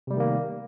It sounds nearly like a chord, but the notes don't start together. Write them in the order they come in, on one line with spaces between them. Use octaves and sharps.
C3 G3 A3 D#3 A#3